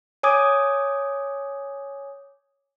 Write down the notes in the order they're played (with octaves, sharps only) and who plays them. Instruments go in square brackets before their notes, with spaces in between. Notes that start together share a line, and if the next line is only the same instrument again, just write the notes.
[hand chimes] C#5 G#5 D6 D#6 G#6